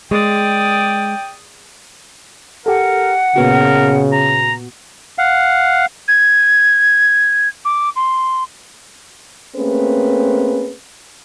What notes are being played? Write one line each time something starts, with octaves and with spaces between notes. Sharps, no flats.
G#3 D5 G5 D#6
G4 A4 A#4 F#5
A#2 C#3 B3 F#4 A#4
A#5
F5 F#5
G#6
D6
C6
A3 A#3 C4 C#4 G#4 B4